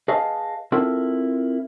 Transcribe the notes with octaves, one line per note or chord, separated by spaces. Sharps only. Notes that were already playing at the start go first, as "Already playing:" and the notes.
G#4 B4 D#5 F5 A5
C4 E4 F4 A4 A#4